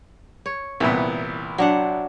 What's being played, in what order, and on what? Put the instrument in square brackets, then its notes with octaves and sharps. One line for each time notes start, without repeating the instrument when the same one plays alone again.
[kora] C#5
[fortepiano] C2 A#2 B3 [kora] E3
[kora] F#3 D4 F#5